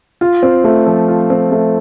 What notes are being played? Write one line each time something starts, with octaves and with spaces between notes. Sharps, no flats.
F4
C4
A3
F3
F4
C4
A3